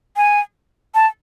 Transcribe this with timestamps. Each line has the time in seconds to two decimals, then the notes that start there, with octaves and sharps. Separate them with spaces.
0.17 G#5
0.95 A5